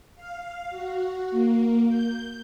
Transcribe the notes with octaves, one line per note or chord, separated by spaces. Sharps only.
F5
F#4
A#3
G6